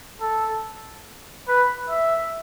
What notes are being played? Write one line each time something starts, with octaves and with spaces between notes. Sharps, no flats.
A4
B4
E5